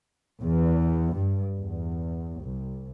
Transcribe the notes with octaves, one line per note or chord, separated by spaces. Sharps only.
E2
G2
E2
C2